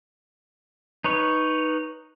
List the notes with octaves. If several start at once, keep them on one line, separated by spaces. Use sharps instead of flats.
D#4 B4 C#5